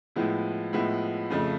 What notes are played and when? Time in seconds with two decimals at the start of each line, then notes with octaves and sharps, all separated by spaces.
0.16 A2 F3 G#3 B3 E4
0.73 A2 F3 G#3 B3 E4
1.30 F2 C#3 F3 A3